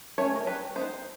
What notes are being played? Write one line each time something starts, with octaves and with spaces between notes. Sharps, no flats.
A3 C#4 C#5
A#4
G3 B4
B3 D#4 C5